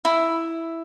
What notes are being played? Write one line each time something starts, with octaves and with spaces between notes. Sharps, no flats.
E4